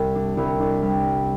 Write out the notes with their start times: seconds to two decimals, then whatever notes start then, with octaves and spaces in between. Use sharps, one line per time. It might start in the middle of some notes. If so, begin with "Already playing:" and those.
Already playing: C2
0.15 D4
0.37 C2
0.60 D4
0.82 G3